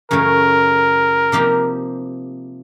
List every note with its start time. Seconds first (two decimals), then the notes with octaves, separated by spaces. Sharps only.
0.11 F#2 C#3 E3 A3 C#4 A#4
1.32 C3 F3 A#3 D#4 G4